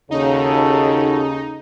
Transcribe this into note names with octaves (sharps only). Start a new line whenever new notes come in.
D#2 C#3 D#4 F#4 A4